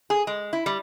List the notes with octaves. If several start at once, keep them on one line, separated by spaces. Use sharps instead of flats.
G#4
G#3
E4
G3